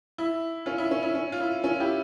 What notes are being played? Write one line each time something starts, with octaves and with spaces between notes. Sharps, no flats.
E4
C#4 F4
E4
C#4
E4
C#4
F4
E4
C#4 F4
E4 G4